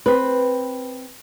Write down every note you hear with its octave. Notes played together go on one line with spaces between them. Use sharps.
C4 B4